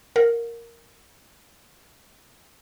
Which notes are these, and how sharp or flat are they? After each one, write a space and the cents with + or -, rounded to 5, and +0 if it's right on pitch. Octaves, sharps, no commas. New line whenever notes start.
A#4 +0 F#5 -40